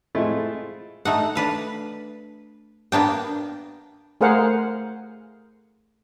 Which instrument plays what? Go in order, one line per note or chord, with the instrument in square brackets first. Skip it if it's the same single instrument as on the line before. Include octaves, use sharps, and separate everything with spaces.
[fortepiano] G#3 A3 C4 E4 F4
[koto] A3 D#4 F#5
D4 B4 F5
A#3 B3 D4 G5
[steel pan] A3 G#4 A#4 C5 F5 F#5